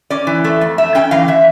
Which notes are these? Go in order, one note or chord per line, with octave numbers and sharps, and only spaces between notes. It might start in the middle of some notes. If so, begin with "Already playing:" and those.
C#4 D5
E3
A3
F2
A3 E5
C#4 G5
E3 F5
E3 E5